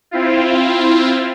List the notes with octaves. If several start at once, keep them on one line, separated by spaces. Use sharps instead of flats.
C4 E4 F4